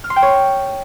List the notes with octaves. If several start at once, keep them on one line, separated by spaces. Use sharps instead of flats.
F6
C6
G5
C#5